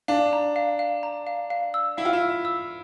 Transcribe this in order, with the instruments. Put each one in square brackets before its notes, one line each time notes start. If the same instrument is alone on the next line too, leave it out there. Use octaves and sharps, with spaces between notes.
[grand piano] D4 [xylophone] F5
[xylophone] A#5
F5
F5
A#5
F5
F5
E6
[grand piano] E4 [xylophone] F5
[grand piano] F4
E4
[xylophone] F5
E6